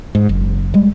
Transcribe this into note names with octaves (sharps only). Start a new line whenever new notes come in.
G#2
F#1
G3 G#3